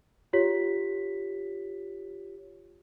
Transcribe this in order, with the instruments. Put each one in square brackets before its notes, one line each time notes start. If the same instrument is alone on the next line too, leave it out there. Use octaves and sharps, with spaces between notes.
[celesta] F4 G4 C#5 B6